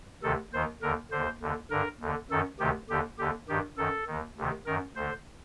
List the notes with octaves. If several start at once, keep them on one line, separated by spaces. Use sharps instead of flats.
D2 C3 D#3 A4
D#2 D#3 C5
D#2 D3 A#4
D3 C5
D#2
D#2 D3
G2 D3 A#4
D#2 D3
F#2 D#3 A4
D2 C3 D#3 G4
D#2 D3 G4
D#2 D3 G4
G2 D#3 G4
F#2 D#3 A4
D#2 D#3
D2 C3 D#3
F#2 D#3 A#4
D2 D3 C5